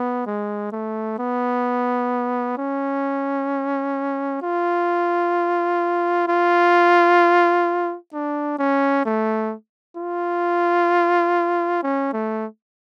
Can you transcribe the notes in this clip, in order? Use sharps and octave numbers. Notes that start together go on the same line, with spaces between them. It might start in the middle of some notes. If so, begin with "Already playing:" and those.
Already playing: B3
G#3
A3
B3
C#4
F4
F4
D4
C#4
A3
F4
C#4
A3